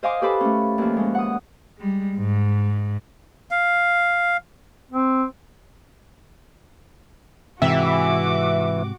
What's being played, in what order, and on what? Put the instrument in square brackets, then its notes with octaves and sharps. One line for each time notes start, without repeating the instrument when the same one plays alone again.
[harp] C5 D#5 F5 G#5 C6 D6
G4 A4 B4 C5 B5 D6
A3 C#4
D#2 F3
G#3 C#4
F#5 D#6
[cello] G3 G#3
G#2
[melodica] F5
[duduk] C4
[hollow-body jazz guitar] G#2 C3 [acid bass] E3 [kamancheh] F#4 D6 [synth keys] E5